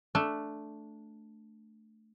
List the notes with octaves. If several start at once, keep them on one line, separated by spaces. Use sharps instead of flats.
A3 D4